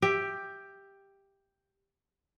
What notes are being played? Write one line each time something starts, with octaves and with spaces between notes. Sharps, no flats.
G4 E5